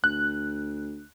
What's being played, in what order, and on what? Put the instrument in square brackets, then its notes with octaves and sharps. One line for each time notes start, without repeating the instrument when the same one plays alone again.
[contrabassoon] D2 [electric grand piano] F#6